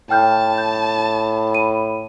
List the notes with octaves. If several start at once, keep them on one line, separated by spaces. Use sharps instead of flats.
A2 G5 A5 F6 G6
G6
B5 D#7